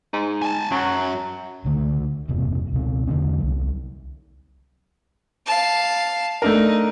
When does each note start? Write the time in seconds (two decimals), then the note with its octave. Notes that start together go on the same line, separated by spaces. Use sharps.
0.13 G#2
0.42 G#5 A5
0.71 F#2 F#3
1.65 C#2 D3 A3
2.29 E1 G2 C3 A#3
2.72 C#2 B2 C4
3.07 E2 D3 A#3 C#4
3.39 C2 F#3
5.46 F5 A5
6.42 A3 D4 D#4 A#4